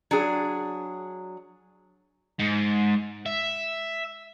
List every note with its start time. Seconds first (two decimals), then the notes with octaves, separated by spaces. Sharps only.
0.11 F#3 D4 G#4
2.39 G#2
3.26 E5